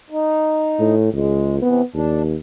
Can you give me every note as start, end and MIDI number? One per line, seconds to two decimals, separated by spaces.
0.10 0.95 63
0.79 1.13 45
1.13 1.59 37
1.13 1.56 56
1.62 1.82 48
1.62 1.82 52
1.62 1.82 59
1.94 2.37 39
1.94 2.22 62